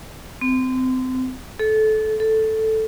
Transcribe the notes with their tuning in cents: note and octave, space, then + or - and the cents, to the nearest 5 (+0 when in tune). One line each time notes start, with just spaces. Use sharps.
C4 -30
A4 -20
A4 +0